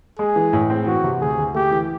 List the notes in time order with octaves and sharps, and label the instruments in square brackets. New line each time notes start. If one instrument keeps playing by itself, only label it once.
[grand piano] G#3 [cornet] G#4
[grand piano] E3
A2
C4
[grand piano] E3 [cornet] F#4
[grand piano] C3
[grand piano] D2 [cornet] G#4
[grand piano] D2
[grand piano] A3 [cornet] G4
[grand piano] E3